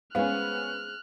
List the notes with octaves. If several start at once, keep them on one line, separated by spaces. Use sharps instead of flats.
G#3 B3 C#4 C5 F5 F6 F#6